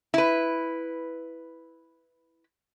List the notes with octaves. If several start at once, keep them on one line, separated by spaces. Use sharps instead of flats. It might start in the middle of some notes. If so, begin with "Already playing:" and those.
E4 B4